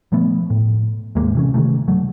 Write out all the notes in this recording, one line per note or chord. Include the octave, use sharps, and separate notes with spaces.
A#2 F3 A3 B3
A2
D#2 G#2 G#3 A#3
C3 E3 C#4
C3 D#3 E3 A3
F#1 F#3 A3